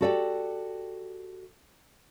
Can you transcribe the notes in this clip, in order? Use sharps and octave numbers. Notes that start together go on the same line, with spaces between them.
F#4 G4 A4 D5 E5 G5